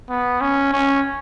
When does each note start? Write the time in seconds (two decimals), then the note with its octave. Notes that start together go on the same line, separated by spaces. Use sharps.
0.10 B3
0.41 C#4
0.73 C#4